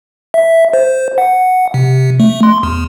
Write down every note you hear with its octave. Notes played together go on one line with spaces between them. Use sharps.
E5
C5
F#5
C3
A3
C6
E2